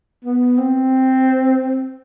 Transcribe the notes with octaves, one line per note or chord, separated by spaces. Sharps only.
B3
C4